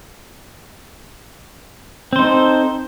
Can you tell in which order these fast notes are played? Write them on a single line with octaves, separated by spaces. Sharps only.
C4 C5 D#4 A4